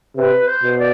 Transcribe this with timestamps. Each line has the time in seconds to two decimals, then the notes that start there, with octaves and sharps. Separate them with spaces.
0.16 C3 B4
0.47 C5
0.63 B2
0.78 D5